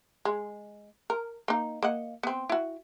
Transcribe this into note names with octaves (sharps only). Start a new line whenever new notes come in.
G#3
A#4
A#3 D#4
A#3 D#5 F#5
B3 C4
E4 F#4